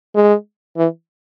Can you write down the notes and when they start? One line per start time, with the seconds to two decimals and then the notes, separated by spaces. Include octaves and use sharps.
0.15 G#3
0.77 E3